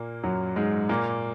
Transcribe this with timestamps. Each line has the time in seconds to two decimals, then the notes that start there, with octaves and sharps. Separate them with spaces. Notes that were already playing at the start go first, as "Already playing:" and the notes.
Already playing: A#2 A#3
0.24 F#2 F#3
0.56 G#2 G#3
0.89 A#2 A#3